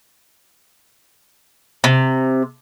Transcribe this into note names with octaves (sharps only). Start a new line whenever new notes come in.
C3